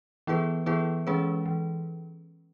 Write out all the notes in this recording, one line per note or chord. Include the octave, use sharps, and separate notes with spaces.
E3 B3 E4 G#4 B4
E3 B3 E4 G#4 B4
E3 G#3 C#4 G#4 B4
E3